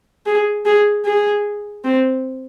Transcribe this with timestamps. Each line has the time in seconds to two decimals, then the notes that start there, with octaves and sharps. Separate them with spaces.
0.26 G#4
0.65 G#4
1.05 G#4
1.84 C4